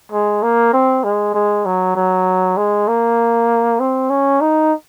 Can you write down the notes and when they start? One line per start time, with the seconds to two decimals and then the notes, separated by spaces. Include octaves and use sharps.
0.12 G#3
0.43 A#3
0.73 C4
1.04 G#3
1.35 G#3
1.66 F#3
1.96 F#3
2.57 G#3
2.88 A#3
3.80 C4
4.10 C#4
4.41 D#4